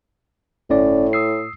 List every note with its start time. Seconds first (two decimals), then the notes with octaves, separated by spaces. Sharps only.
0.70 G1 A2 C#4 D5
1.13 D#6 E6 C7